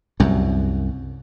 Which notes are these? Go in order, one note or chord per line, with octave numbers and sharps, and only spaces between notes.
C2 F#2